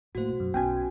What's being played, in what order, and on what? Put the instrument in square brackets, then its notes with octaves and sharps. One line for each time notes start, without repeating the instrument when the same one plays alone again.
[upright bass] A2 A#3 [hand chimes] F#4 C5
[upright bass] B1
[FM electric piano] F#2
[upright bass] B1 G2 [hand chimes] B3 C#4 F#4 [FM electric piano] G5 G#5